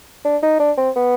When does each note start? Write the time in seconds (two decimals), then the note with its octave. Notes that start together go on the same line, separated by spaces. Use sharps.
0.25 D4
0.43 D#4
0.59 D4
0.77 C4
0.96 B3